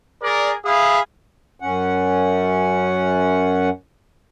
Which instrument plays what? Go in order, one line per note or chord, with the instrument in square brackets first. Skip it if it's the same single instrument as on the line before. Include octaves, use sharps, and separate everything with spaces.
[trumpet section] G#4 A#4 D5
G#4 E5 F5 B5 D#6
[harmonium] F#2 C#4 F#5